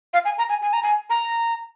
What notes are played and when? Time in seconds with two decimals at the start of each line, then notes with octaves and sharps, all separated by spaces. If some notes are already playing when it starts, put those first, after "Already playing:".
0.14 F5
0.25 G#5
0.38 A#5
0.49 G#5
0.62 G#5
0.73 A#5
0.83 G#5
1.10 A#5